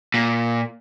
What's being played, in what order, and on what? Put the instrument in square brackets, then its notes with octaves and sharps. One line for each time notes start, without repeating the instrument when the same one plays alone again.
[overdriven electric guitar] A#2